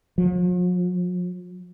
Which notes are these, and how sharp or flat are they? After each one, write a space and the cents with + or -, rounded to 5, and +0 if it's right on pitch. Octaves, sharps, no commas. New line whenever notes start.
F3 +45